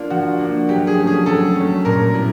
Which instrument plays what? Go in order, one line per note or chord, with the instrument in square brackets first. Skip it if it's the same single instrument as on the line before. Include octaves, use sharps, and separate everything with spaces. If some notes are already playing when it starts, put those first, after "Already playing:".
Already playing: [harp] A#3 D4 [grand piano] F4
[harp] F3 [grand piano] F#4
[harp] A#3 D4
[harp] F#3 [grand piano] G4
[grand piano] G#4
[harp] A3 C#4
[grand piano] G#4
[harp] F#3 [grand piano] A4
[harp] C#4
A3
[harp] A#2 [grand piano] A#4
[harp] G3 B3 E4